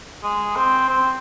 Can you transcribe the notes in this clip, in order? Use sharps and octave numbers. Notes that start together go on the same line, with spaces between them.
G#3
C4
C4